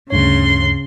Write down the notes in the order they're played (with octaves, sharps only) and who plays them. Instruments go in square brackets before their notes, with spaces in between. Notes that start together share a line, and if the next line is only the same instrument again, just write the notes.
[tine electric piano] D2 G2 C#5 [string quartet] C#3 C6